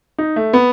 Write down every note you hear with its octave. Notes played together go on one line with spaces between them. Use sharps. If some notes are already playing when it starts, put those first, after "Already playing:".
D#4
A3
B3